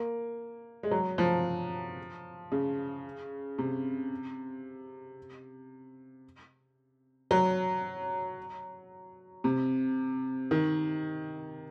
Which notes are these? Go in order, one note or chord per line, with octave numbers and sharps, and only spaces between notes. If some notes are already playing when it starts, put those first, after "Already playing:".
Already playing: A#3
G#3
F#3
F3
C#3
C3
F#3
C3
D#3